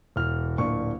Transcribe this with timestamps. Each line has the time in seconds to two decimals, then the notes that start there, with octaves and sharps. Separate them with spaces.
0.16 E1 F6
0.58 D1 A#2 D4 C#6